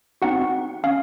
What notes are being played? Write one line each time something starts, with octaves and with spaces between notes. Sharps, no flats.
C4 D#4 F#4 F#5
C#4 F5